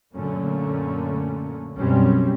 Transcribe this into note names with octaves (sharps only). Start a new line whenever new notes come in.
F#2 A#2 D3 A3 A#3 C#4
B1 F#2 B2 G3 C4 C#4